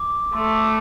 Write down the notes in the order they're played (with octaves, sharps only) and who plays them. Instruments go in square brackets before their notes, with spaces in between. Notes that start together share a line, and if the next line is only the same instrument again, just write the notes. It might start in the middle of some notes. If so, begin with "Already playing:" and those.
Already playing: [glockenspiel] D6
[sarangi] A3 [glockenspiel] C6
[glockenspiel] C6
D6